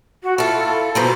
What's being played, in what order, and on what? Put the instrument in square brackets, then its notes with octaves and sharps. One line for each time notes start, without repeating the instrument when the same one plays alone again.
[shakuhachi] F#4
[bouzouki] E4 F4 [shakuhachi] A4
[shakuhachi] A4
[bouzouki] B2 F3 A#3 [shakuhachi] C5